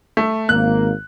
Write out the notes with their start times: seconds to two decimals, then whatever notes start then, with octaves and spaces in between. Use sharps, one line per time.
0.17 A3
0.49 G#1 A#3 F#6